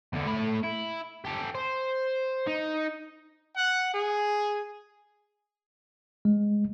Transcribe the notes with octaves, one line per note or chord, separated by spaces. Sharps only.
E2 D3
A3 B5
E4
G4 A4
C5
D#4
F#5
G#4
G#3